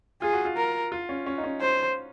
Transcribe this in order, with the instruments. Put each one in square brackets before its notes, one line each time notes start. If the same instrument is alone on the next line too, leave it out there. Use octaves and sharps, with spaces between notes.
[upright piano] F4 [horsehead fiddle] G#4
[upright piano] F#4
F4
[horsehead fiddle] A#4
[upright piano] F4
C#4
C#4
D#4
C#4
[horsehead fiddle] C5